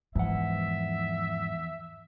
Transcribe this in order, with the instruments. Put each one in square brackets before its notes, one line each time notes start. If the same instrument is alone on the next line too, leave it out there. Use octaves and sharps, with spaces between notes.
[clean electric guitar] E2 F#5 [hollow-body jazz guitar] G#2 [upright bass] F3 [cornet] E5